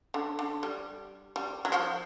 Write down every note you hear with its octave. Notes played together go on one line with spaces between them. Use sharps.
D3
D3
G3
G3
F#3
F3